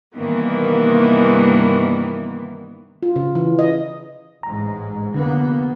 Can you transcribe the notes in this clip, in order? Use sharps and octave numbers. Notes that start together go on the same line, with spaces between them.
G2 C3 D#3 E3 A#3 B3
F4
C#3
E3
D#5
A1 G#2 A#5
F1 D3 A#3 B3